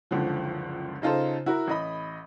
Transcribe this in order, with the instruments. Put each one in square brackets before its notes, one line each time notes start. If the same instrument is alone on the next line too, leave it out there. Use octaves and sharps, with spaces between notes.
[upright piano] F#1 C#2 D3 F3
C#3 D#4 F4 A4 C5
E4 F#4 A#4
A1 D#5 B5